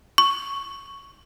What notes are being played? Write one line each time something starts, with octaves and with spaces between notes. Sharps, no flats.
C#6